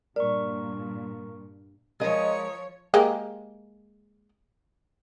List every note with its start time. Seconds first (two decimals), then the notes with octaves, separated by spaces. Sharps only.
0.16 G2 A#2 A#4 D5 C#6
2.00 F3 G#3 A#4 C#5 D#5
2.94 G#3 A#3 G4